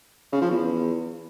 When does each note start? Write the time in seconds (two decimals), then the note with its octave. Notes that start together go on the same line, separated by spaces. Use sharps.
0.33 C#3
0.42 F3
0.51 E2